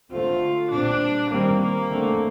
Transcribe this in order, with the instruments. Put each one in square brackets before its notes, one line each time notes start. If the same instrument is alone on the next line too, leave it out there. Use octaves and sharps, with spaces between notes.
[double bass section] D3 A3 C4 [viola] F4
[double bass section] A#2 G3 C4 [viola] D4
[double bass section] D#3 G3 C4 [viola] A#3
[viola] A#3
[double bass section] D3 A3 C4